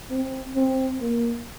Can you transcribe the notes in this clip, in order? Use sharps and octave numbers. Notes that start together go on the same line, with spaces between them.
C4
C4
A#3